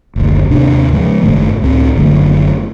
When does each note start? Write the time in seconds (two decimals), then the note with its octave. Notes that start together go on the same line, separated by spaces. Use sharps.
0.16 F#1 D2
0.50 D#2 G#2 C3 D4
0.93 C#3 F3 G#3
1.22 F#1 G#2 D#3 A3
1.62 C#2 A2 C4
1.96 F#1 D3 F#3 A3